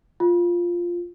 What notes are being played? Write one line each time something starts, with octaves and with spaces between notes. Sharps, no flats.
F4